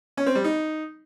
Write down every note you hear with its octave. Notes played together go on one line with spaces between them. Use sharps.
C#4
C4
G3
D#4